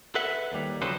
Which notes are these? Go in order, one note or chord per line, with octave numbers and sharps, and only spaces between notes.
A4 B4 E5 F#5
D#2 G3
C#3 F3 F#3 A4 B4 C5